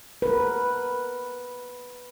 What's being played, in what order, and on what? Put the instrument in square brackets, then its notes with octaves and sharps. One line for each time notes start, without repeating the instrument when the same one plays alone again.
[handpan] A#4 B4